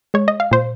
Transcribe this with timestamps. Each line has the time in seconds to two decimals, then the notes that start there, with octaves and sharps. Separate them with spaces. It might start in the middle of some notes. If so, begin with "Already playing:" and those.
0.14 G#3 C#5
0.28 D#5
0.40 F5
0.51 A#2 C5